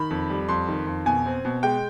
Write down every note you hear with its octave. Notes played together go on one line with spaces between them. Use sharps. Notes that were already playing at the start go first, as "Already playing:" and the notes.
Already playing: D#3 B5
F2
G3
F2 C6
D#3
F2
B2 G#5
C4
B2
G#3 G5